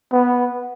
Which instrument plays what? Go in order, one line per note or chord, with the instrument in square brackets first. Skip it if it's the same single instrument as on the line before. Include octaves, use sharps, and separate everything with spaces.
[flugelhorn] B3